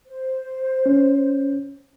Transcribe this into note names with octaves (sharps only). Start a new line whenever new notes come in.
C5
C#4